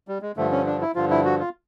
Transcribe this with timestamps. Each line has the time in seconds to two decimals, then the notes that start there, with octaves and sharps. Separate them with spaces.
0.08 G3
0.22 G#3
0.36 G2 D3 F3 A3
0.52 C#4
0.67 D4
0.81 E4
0.95 G2 D3 F3 F4
1.11 E4
1.25 F#4
1.39 F4